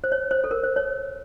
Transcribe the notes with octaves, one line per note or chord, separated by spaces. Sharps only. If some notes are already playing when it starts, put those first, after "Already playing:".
C5
C#5
C5
A4
A#4
C5
C#5